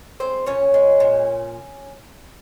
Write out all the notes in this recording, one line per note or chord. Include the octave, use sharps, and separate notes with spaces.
G#3 C4 C5
A#2 C#4 C#5
G#3
A#2